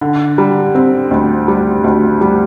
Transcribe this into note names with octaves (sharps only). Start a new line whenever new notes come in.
D3
G3
C4
D2
G3
D2
G3